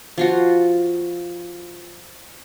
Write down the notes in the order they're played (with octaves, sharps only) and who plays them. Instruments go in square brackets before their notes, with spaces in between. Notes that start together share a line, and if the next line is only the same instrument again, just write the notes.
[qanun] F3 F4 F#4